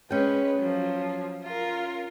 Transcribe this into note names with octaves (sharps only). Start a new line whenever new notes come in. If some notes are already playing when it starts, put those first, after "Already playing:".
G#3 C#4 B4 G5
F3 F#3
F4 A#4